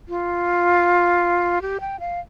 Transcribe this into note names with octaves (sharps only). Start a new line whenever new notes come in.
F4
G4
G5
F5